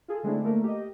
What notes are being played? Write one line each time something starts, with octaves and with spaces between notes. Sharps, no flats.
F4 G#4 A4
D3 G#3 A3 C4 D4 E4
A3 A#3 A#4
G4 D#5